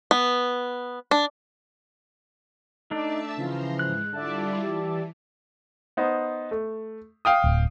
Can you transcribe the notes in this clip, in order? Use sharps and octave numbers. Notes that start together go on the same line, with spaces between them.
B3
D4
A3 D4 D#4 D5 E5 A5 E6
C#3 E3 F3 A#5 C6
G#2 G#3 F#6
D3 G3 E4 F4 D5 E5 A5
E3 G4
B3 D#4 C5
A3
F5 G5 D#6
D1